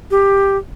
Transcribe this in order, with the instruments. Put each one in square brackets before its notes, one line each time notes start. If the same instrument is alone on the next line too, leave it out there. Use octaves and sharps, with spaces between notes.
[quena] G4